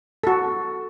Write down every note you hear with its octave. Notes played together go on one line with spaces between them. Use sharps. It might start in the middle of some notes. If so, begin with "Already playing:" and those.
F#4 A4